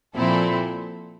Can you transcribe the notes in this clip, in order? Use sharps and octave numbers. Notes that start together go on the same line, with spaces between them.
A#2 F3 C4 E4 A4